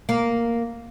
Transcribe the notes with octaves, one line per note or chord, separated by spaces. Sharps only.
A#3